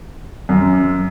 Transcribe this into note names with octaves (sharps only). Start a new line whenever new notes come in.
F#2